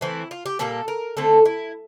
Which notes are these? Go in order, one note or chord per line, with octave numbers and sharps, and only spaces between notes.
E3 A3 C4 E4
F4
G4
A#2 G3 A#3 A4
A#4
D3 A3 C4 A4
E4